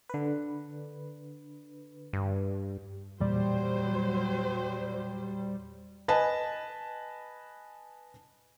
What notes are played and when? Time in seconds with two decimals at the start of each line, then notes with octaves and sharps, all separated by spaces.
0.10 D3 B4
2.13 G2
3.20 E2 A#2 F#3 G3 C5 D5
6.08 B4 D#5 G#5 A5